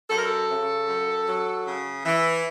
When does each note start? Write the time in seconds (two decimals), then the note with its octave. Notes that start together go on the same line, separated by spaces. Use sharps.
0.10 F#2 A4
0.18 A#4
0.25 A4
0.49 C#3
0.88 F#2
1.27 F#3
1.66 C#3
2.05 E3